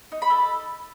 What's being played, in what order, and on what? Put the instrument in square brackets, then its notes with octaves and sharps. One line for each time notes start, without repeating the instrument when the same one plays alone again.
[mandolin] D#4
B5
A4